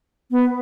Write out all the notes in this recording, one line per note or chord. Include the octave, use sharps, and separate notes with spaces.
B3